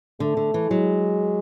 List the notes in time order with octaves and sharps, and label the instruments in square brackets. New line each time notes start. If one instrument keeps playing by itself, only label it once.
[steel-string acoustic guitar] D3 [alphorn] A3
[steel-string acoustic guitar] D3
E3
[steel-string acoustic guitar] F#3 [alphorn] G#3